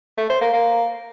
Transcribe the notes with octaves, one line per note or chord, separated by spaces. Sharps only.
A3
C5
A#3
A#3